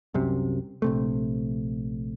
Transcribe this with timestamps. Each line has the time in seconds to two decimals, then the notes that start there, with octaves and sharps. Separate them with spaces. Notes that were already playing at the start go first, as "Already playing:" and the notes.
0.14 C2 F#2 C3
0.82 A#1 C3 A3